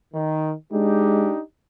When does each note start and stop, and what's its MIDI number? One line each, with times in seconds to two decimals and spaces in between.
0.13 0.53 51
0.73 1.32 56
0.73 1.40 62
0.73 1.40 63
0.73 1.40 67